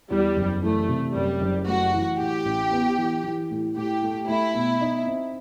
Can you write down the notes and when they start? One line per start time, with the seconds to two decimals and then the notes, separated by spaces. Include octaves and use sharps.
0.10 E2 G3
0.37 F#1
0.62 E3 A3
0.89 C3
1.15 F#2 G3
1.41 F#1
1.67 A3 F#4
1.93 E3
2.19 A2 G4
2.45 A1
2.71 B3
2.98 E3
3.24 E3
3.51 A2
3.77 A2 G4
4.03 A3
4.28 A3 E4
4.54 B2
4.81 D#4
5.07 C4